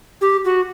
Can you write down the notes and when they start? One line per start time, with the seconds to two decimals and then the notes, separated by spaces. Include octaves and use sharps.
0.21 G4
0.45 F#4